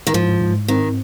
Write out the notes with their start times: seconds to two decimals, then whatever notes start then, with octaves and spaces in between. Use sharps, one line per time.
0.07 D#3
0.14 G#2 F3
0.41 G#2
0.68 D#3 C4